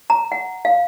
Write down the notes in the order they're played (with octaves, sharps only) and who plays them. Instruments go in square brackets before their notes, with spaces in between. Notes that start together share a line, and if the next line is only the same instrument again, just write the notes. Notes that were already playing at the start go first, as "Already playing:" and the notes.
[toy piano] A#5
F#5
F5